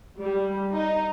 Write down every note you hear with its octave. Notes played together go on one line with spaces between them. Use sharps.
G3
D#4